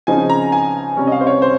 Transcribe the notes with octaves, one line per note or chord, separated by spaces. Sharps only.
C#3 F3 C4 D#4 G#5
A#5
G#5
C3 G3 C#4
D#5
F5
C5
C#5
C5